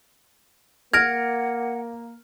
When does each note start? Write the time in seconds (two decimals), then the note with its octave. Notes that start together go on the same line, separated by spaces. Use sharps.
0.93 A#3 F#5 F6 G#6 A#6 D7